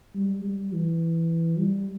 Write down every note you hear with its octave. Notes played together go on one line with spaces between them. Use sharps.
G3
G3
E3
G3